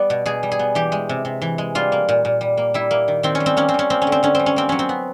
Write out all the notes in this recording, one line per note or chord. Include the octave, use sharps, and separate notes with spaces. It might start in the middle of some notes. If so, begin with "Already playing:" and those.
Already playing: G3 B3 D5
B2
B2 G#4
G3
G#4
B3
E3 G4
G#3
C3
C3
E3
G#3
G3 F4
A#3
A#2
A#2
G3
A#3
G3 E4
A#3
D#3
D#3 C4
C#4
G3
C4
A#3 C#4
C4
G3 C#4
A#3 C4
C#4
D3
C4
D3 C#4
G3 C4
C#4
A#3 C4
F#3 C#4
C4
B3